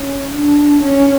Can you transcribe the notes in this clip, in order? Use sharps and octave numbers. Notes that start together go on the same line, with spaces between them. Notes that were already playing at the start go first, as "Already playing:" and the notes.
Already playing: C#4
D4
C#4